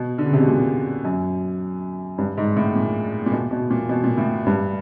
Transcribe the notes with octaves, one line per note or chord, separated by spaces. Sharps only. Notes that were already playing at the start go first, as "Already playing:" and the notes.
Already playing: B2
D3
C#3
C3
B2
A#2
F#2
G2
G#2
A2
A#2
A#2
B2
B2
A#2
B2
A#2
A2
G2